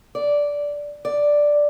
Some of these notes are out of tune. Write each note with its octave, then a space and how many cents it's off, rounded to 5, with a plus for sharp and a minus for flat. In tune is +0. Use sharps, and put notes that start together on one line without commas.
D5 -10
D5 +0